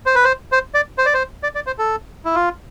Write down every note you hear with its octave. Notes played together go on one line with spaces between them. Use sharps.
C5
B4
C5
C5
D5
C5
D5
C5
D5
D5
C5
A4
E4
F4